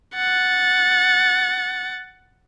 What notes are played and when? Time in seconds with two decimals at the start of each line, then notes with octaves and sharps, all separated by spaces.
0.15 F#5 A6